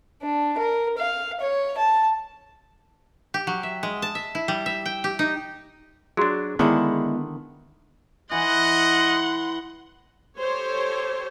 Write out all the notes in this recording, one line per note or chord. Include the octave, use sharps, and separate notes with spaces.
D4
A#4
F5
C#5
A5
G4
F#3
E5
G#3
A5
E5
E4
G3
E5
G5
G4
D#4
F#3 D4 F#4 G#4
D3 D#3 G#3 B3 D4 E4
E3 D#5 F#5 C6
G4 A4 C5 C#5